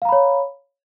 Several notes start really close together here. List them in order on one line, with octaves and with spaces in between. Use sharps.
F5 A#5 B5 C#5